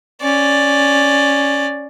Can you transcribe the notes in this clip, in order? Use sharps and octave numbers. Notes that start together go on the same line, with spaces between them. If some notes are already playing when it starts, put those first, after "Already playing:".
C#4 D5